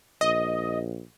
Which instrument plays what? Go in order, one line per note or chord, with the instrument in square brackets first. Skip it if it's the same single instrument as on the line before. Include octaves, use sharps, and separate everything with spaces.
[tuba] A#1 [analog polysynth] D#5